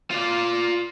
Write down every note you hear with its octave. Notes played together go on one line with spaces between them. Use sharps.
F4 D5